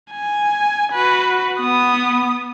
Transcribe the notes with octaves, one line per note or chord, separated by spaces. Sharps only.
G#5
F#4 B4
B3 D#6